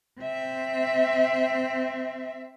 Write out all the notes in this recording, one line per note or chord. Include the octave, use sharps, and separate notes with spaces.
C4 E5